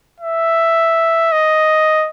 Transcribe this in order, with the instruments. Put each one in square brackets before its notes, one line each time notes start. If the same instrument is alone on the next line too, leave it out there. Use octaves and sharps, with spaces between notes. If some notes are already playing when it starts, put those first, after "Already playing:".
[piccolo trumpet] E5
D#5